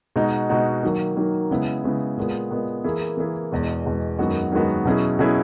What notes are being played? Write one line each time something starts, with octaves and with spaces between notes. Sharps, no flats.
B2 G#3 D#4 F#4
B2 G#3 D#4 F#4
D#3 F#3 A#3
D#3 F#3 A#3
C#3 G#3 B3 E4
C#3 G#3 B3 E4
A#2 G#3 B3
A#2 G#3 B3
E3 A#3 E4 G#4
E3 A#3 E4 G#4
E2 B2 G#3
E2 B2 G#3
F#2 D#3 G#3 B3 F#4
F#2 D#3 G#3 B3 F#4
B2 F#3 C#4 E4 G#4
B2 F#3 C#4 E4 G#4